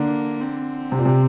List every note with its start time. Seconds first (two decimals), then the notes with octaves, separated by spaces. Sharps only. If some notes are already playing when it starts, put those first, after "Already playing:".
Already playing: D3 A#3
0.40 C4
0.92 C3
0.99 A#2
1.06 C3